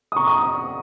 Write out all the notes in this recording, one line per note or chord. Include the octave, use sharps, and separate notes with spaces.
D#6
A#5 C#6
D#6